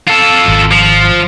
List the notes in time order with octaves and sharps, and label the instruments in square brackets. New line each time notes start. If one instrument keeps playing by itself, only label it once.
[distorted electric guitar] F4 A4
[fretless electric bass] G#1
[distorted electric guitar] F3